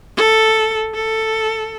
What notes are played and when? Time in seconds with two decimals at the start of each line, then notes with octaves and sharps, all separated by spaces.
0.17 A4
0.94 A4